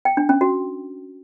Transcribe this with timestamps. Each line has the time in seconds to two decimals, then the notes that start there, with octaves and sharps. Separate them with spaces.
0.05 G5
0.17 D4
0.29 C#4
0.41 F#4